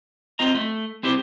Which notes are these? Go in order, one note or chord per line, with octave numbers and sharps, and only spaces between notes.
C4 F4 D#5 A#5
A3
C4 E4 G4 C5